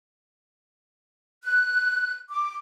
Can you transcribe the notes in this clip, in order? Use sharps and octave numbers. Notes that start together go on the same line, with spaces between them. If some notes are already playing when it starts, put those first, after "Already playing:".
F#6
D6